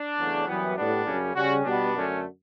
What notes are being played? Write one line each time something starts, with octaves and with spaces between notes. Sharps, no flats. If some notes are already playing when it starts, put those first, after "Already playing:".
Already playing: D4
E2 C#3 F#3 A3
F#2 E3 G3 B3
A2 G3 B3 D4
F#2 C#3 G3 C#4
C#3 G3 C#4 F#4
B2 G3 B3 D4
F#2 D3 A3 C#4